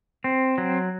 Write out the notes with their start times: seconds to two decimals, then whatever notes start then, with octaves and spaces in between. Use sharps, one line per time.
0.24 C4
0.58 F#3